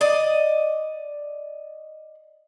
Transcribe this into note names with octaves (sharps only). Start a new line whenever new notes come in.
D5 D#5